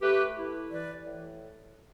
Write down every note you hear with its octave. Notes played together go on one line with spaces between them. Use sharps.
A3 G4 B4
E4
E3 B4 D5
A2